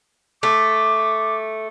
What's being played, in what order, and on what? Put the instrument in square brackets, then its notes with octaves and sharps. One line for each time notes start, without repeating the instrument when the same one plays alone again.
[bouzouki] A3 [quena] D6